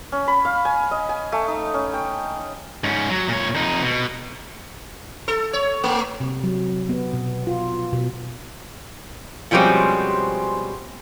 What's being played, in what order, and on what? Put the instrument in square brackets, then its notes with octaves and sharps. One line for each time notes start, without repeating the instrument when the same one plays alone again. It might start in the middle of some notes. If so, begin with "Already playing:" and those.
[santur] C#4
B5
F5
G#5
D#5
G#5
A3
D#4
C#4
G5
[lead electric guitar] G#2 C#4
F#3
A#2 C#5
F2 D#4
B2
[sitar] A4
C#5
A3
[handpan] C3
F#3
B3
B2
F4
B2
[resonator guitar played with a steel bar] B2 F3 G3 G#3 C4 C#4